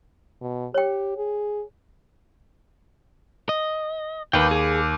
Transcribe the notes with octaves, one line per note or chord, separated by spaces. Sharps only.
B2
G4 C#5 G5
G#4
D#5
D#2 B4 G5
G#4